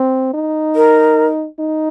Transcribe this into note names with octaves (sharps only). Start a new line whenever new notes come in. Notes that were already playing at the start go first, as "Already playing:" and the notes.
Already playing: C4
D#4
A#4
D#4